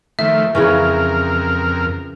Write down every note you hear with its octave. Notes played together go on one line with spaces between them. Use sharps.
D#3 F3 A3 E5
F2 C#3 E3 C#4 A#4